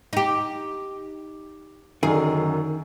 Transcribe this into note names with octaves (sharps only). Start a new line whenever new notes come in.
D#4 G4
F#2 D3 D#3 G#4